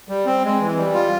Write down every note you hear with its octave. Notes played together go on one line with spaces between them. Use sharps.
G3
C4
G#3
E3
G3
F4